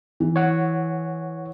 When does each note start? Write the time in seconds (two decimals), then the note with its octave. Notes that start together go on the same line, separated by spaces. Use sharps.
0.20 E3
0.36 C#5 F#5